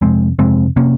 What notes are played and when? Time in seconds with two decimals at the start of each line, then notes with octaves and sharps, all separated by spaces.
0.02 F2 C3 G#3 C4
0.39 F2 C3 G#3 C4
0.76 C3 A#3 C#4